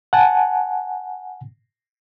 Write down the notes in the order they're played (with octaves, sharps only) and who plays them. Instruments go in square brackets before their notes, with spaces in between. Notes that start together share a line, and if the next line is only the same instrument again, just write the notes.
[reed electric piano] F#5 G#5 A5